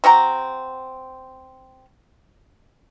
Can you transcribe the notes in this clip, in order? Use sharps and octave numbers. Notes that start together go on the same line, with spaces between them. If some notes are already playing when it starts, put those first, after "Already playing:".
C4 F#4 G5 A#5